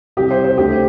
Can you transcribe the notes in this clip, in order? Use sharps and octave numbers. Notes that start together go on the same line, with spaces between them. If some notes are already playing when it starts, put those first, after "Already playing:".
C2 C3 G4
C5
C5
D2 D3 G4